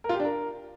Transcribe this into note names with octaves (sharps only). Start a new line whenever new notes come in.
A#4
F4
G4
D4
A#4